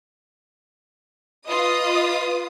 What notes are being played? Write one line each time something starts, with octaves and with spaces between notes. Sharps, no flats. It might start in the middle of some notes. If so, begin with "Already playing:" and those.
F4 B4 D#5 D#6